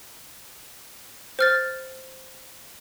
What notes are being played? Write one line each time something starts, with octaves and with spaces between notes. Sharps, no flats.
C5 F6 A6